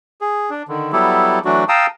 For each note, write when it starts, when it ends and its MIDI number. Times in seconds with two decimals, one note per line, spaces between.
0.21 0.50 68
0.50 0.63 62
0.68 0.91 50
0.68 0.91 51
0.93 1.39 54
0.93 1.39 55
0.93 1.39 59
0.93 1.39 64
0.93 1.39 67
0.93 1.39 69
1.45 1.64 52
1.45 1.64 54
1.45 1.64 57
1.45 1.64 62
1.45 1.64 66
1.69 1.86 77
1.69 1.86 79
1.69 1.86 81
1.69 1.86 82
1.69 1.86 87
1.69 1.86 88